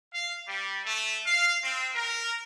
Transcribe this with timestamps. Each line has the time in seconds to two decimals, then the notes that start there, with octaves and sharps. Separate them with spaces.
0.14 F5
0.46 G3
0.86 A3
1.26 F5
1.63 C4
1.95 A#4